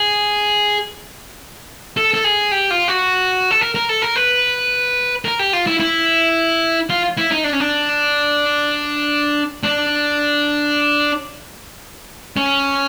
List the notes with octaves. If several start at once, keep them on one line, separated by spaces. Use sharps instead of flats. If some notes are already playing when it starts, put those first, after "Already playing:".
Already playing: G#4
A4
A4
G#4
G4
F4
F#4
A4
A#4
A#4
A4
A#4
B4
A#4
G4
F4
E4
E4
F4
E4
D#4
D4
C#4
D4
D4
C#4